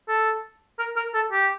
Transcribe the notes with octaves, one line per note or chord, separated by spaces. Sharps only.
A4
A#4
A#4
A4
G4